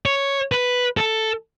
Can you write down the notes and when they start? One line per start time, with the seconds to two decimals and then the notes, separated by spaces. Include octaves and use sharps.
0.06 C#5
0.52 B4
0.97 A4